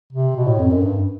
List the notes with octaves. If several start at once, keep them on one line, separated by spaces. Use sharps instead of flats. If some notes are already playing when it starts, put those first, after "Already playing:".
C3
B2
A2
F2
F#2
G2